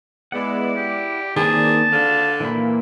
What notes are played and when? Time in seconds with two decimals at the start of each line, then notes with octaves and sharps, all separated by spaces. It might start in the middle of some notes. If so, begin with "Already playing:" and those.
0.32 G#3 B3 E4 D5 F#5
0.76 G4 D5
1.36 D#3 A#3 C4 G#4 A5
1.92 D3 F5
2.40 A#2 E3 A#3 B5